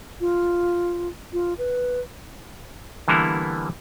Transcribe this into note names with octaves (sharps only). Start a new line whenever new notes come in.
F4
F4
B4
D3 E3 G3 A#3 B3 E4